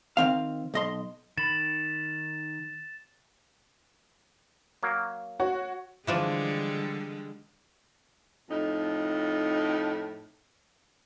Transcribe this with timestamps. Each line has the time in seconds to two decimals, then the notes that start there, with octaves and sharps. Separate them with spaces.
0.17 D#3 C4 F5
0.74 B1 D#5 C6
1.37 D#3 B5 A6 E7
4.83 F#3 A#3
5.40 F#4 C#5
6.07 D3 E3 F3 G3 G#3 D4
8.49 F2 A2 D#4